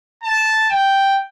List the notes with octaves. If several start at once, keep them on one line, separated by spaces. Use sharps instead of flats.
A5
G5